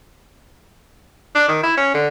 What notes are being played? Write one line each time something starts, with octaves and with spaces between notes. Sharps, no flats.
D4
D#3
E4
C#4
D3